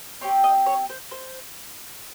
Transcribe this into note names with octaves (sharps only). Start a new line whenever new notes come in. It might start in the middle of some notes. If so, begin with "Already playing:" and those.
C4 G4 C#5
D#5
C#5
C5
C5